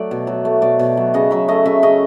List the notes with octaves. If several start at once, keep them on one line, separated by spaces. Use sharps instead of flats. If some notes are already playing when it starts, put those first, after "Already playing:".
Already playing: F#3 A3 D5
B2
F#3
A3
B2 D5
B2
F#3
C#3 D#5
F#3 E5
A3 D#5
C#3 E5
C#3 D#5